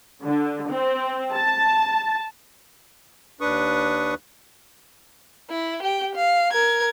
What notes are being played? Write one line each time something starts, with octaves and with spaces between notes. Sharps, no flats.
D3
C4
A5
D#2 D4 B4 C#6 D#6
E4
G4 G5
F5
A#4 G#6